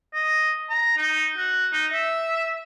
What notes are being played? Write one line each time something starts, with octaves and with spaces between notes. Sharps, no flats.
D#5
A#5
D#4
F#4
D#4
E5